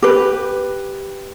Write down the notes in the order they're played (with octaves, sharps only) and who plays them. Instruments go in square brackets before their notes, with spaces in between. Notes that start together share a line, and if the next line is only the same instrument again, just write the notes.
[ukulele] G4 B4